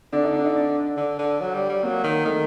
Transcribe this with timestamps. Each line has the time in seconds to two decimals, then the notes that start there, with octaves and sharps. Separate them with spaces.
0.13 D3 D4
0.23 D#4
0.34 D4
0.44 D#4
0.55 D4
0.97 D3
1.19 D3
1.41 F#3
1.54 G3
1.69 G3
1.83 F#3 A#3
2.04 D#3
2.25 D#3 A3